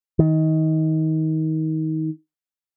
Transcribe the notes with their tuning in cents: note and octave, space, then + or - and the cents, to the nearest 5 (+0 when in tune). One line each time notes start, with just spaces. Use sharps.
D#3 +25